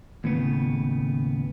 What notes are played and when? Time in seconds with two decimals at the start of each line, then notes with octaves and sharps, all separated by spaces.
0.24 D#2 A2 C#3 B3